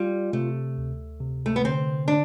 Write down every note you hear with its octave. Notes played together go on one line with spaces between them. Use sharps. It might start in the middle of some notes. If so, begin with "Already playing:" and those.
Already playing: G3 F4
C3 A3
D2
C3
A3
B3
D3 C4
D3 D4